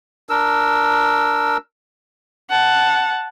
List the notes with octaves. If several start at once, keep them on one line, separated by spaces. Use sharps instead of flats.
D4 A#4 E6
F#5 A5